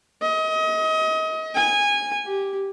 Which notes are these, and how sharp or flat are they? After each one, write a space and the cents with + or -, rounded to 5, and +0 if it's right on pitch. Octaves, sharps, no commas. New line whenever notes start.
D#5 +30
G#5 -20
G4 -5